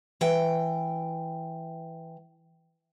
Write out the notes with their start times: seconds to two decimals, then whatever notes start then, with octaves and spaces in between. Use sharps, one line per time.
0.21 E3 G5